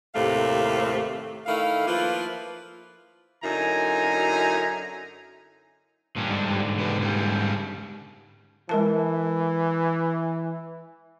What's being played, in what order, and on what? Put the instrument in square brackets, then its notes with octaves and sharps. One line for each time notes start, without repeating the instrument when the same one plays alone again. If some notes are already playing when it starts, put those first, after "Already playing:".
[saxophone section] D#2 A2 C3 A3 F5
D#3 A3 E4 F5
F3 A#3 E4 F4 B4
[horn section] F#2 D3 D#4 E4 G#5 A#5
[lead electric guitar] G2 [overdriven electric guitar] A#2 C#4
[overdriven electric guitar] G#2 D3
[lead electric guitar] C3 B4
C#3 G3
[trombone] E3 [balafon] G#3 A#4 A5